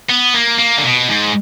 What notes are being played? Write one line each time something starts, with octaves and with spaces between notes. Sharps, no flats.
B3
A#3
A#3
D3
B2
G#2